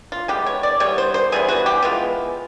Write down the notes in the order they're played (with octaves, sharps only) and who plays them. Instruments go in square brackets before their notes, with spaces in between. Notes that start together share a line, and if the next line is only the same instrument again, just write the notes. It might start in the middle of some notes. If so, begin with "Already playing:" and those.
[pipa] F4
E3 G#3 B3 G4
C#5
D5
E3 G3 B3 C#5
C5
C5
E3 G3 B3 G#4
F#4
G4
E3 G#3 B3 F4